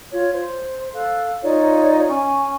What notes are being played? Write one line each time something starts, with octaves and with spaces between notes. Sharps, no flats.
F4 C#5
C5
A4 F5 F#6
D#4 F4 C#5 D5
C#4 G#5 C#6